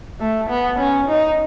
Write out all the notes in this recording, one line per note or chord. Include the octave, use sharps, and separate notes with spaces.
A3
B3
C#4
D#4